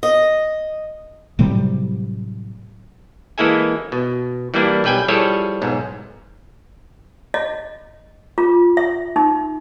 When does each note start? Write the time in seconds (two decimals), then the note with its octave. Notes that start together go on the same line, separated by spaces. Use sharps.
0.03 D#5
1.39 A2 C3 F#3 G3
3.38 E3 G#3 A#3 E4 A4 G#5
3.92 B2
4.54 E3 G3 A#3 D4 E4
4.84 B1 G3 B4 G5 G#5
5.08 F3 G3 E4 G#4 A4 C#5
5.62 B1 G#2
7.34 D#5
8.38 F4
8.77 E5
9.16 D#4